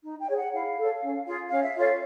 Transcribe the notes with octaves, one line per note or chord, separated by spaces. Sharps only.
D#4
G5
G#4 C#5
F#5
E4 F5
A4 C#5
C#4
F4 G#4
C#4 F5
E5
F4 A4 C#5 F5